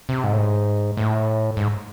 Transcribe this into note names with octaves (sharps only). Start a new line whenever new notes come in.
C3
G#2
A2
G#2
A2
G#2